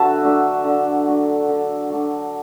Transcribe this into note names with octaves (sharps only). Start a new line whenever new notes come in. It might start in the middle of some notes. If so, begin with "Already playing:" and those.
Already playing: D3 F#3 F#4 B4 E5 A5
F#3 A3 D4
D3
F#3 A3 D4
D3
F#3 A3 D4